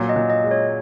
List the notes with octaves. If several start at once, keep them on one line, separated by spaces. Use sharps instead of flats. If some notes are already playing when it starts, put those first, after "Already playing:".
Already playing: A#2 F#3
D#5
A#2
D#5
G#3
C#5